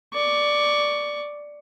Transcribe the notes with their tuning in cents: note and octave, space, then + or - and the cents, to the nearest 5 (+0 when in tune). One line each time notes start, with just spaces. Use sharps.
D5 +0 C#6 +15